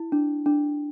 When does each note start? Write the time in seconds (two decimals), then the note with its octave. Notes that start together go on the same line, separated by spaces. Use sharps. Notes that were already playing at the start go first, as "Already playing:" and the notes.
Already playing: E4
0.12 D4
0.46 D4